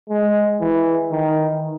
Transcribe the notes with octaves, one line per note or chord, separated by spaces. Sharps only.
G#3
E3
D#3